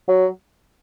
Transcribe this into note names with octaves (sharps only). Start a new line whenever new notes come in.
F#3